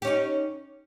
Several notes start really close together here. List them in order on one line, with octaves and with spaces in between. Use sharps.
G4 C#4 D#4